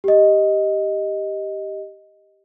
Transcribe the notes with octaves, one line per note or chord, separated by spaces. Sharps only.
G4 D#5